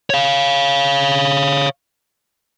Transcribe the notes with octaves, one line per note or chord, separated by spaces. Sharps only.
C#5 F5